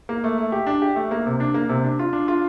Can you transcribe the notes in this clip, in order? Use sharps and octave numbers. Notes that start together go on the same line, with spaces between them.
A#3
A3
A3
G4
D4
G4
A3
A#3
C3
D4
A#3
C3
D4
F4
D4
F4